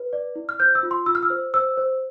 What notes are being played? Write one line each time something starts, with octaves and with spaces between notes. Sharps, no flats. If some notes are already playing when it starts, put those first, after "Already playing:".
Already playing: B4
D5
E4
F6
C5 G6
E6
F4
C6
F4 E6
F6
E6
C5
C5 E6
C5